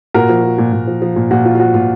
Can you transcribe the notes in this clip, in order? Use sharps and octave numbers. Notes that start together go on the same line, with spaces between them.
A#2 F#4 A#4
F3
F3
A#2
A#2
F3
F3
A#2
A#2 F#4
F3 F4
F4
F3 F#4
A#2 F4